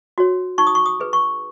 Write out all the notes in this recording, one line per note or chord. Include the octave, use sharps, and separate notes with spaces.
F#4 C#5
D#4 C#6
D#6
C#6
D#6
G#4 B4
C#6